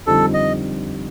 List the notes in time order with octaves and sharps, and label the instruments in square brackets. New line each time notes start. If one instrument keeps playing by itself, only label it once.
[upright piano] F2 D3 G3 C4 D#4 [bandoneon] A4
[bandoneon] D#5